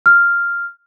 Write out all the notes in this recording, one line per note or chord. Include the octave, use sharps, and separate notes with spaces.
F6